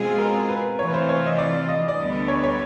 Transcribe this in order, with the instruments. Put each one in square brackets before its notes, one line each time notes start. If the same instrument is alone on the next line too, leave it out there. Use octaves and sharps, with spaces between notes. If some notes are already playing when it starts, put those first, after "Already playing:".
Already playing: [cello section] B2 G#3 C4 F4 G#4
[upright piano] A#4
B4
[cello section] C3 E3 A3 C4 F4 [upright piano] C#5
[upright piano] B4
C5
C#5
D#5
D5
D#5
D5
[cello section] D2 D3 G3 B3
[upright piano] C#5
C#5